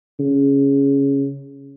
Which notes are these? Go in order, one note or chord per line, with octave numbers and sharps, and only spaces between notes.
C#3